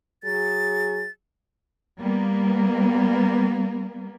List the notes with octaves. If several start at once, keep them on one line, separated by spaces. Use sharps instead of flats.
F#3 G#4 A6
G3 A#3 B3